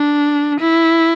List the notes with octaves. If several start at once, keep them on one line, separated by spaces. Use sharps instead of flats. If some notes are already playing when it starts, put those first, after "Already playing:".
Already playing: D4
E4